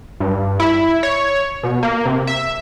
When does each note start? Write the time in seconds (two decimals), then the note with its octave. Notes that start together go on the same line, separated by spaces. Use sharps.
0.20 G2
0.60 E4
1.03 C#5
1.63 B2
1.83 A#3
2.06 C3
2.27 E5